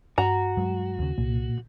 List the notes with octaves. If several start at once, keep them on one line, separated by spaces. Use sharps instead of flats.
G2 F#4 A#5
G2 F#3 G#3
D#2 C#3
C2 A#2